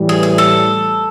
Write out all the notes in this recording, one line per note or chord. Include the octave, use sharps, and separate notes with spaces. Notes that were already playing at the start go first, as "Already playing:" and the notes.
Already playing: A2 E3 G3
G#4
G#4
A4